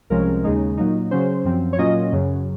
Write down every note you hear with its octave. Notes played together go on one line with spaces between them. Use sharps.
C2 C3 F3 G#3 C#4 A#4
D#2 C#3 G#3 D#4
A#2 F#3 A#3 D#4
C#3 F#3 C#4 C5
F#2 F3 C4
C#5
A#2 F#3 A#3 C#4 F4 D#5
F#2 C#3 F#3